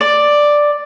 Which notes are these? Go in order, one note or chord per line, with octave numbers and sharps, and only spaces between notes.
D5